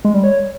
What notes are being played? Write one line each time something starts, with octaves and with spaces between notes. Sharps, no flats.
G#3
G3
C#5